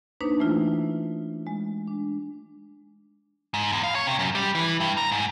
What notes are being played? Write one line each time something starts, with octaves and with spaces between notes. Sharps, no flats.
A#3 D4 D#4 B4 C5
E3 A3 E4 F4
G#3
D4
G#2
E2
F5
C#5
C3
F#2
G3
E3
G2
A#5
G#2